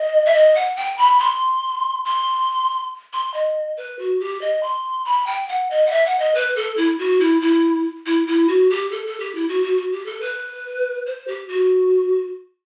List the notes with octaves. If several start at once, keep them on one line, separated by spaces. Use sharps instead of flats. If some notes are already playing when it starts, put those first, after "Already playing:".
Already playing: D#5
E5
D#5
F#5
G5
B5
C6
C6
C6
D#5
B4
F#4
G4
D#5
C6
B5
G5
F#5
D#5
F#5
E5
F#5
D#5
B4
A4
E4
F#4
E4
E4
E4
E4
F#4
G4
A4
A4
G4
E4
F#4
F#4
F#4
G4
A4
B4
C5
G4
F#4